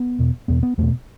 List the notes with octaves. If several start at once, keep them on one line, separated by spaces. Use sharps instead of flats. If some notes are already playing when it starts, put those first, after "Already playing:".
Already playing: B3
E2 B2
E2 B2 B3
B3
E2 B2 A3